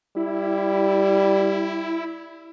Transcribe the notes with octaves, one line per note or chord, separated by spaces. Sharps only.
G3 E4